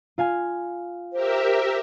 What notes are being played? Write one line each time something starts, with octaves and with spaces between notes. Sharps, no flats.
F4 F5 G#5
G4 A#4 C5 E5